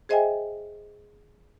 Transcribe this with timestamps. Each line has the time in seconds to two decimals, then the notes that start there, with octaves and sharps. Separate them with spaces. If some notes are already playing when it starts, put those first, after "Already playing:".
0.09 G#4 C5 D#5 E5 G5 G#5